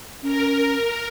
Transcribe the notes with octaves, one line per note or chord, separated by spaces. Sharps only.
C#4 A#4